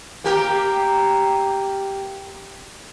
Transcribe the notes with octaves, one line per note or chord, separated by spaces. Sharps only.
A#3 G4 A#4